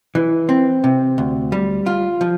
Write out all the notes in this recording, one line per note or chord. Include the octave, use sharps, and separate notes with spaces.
E3
C4
C3
D2
G3
F4
F3